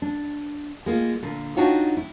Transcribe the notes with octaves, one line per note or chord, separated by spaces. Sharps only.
D4
G#3 A#3 F4
A#2 D3
D4 D#4 F4 F#4 C#5 G5
E4